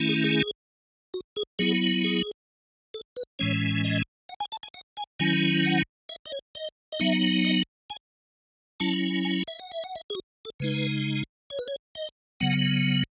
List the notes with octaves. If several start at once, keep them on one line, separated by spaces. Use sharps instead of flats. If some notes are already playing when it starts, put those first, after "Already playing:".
Already playing: D#3 A3 C#4 E4
G#4
G#4
F#4
G#4
F#3 B3 E4 G#4
G#4
A4
B4
A2 E3 G#3 C#4 C#5
D#5
F#5
G#5
A5
G#5
F#5
G#5
D#3 F#3 C#4 E4 G#5
F#5
E5
D#5
C#5
D#5
D#5
F#3 B3 D#4 E5
D#5
G#5
F#3 C#4 E4 A5
G#5
E5
F#5
E5
F#5
E5
G#4
F#4
A4
C#3 G#3 D#4 B4
C#5
B4
C#5
D#5
C#3 F#3 B3 F#5